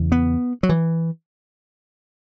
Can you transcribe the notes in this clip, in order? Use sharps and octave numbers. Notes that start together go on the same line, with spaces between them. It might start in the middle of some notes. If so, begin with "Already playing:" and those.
Already playing: E2 C#3
B3
F#3
E3